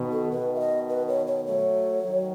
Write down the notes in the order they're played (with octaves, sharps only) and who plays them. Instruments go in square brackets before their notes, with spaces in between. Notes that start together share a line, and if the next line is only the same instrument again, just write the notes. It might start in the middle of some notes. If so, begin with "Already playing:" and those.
Already playing: [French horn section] B2 D#3
[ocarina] A4
[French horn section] B2 D#3 [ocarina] B4
[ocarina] E5
D#5
B4
C#5
C#5
[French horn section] F#3 A3 [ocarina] C#5
[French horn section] D#3 F#3